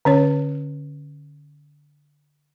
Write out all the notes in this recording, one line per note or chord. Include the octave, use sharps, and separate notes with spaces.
D3 C#4 C#5